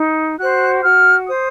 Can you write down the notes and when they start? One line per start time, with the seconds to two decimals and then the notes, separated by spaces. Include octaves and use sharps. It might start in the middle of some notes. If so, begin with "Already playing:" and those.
Already playing: D#4
0.38 F#4 C5 F#6
0.83 F#4 F6
1.28 C5 D#6